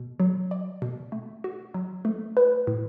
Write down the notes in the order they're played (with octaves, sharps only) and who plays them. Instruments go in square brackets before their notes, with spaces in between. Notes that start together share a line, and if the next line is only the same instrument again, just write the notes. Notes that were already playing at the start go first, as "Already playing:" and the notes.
Already playing: [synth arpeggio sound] B2
F#3
D5
B2
A3
F#4
F#3
A3
B4
A2